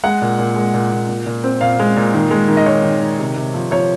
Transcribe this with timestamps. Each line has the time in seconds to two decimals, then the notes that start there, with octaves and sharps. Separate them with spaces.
0.04 G#3 F#5
0.22 A#2
0.39 A#2
0.56 G#3
0.74 A#2
0.92 A#2
1.09 A#2
1.26 A#2
1.44 C4
1.61 A#2 F5
1.79 G#3
1.96 A#2
2.14 D#3
2.31 G#3
2.48 D#3
2.57 D#5
2.66 D#3 C#5
2.84 D#3
3.01 D#3
3.19 C3
3.36 C3
3.54 F3
3.71 F3 C#5